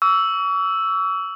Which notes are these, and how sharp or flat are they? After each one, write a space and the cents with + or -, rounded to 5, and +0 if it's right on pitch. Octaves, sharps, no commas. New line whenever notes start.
C#6 +40 E6 +0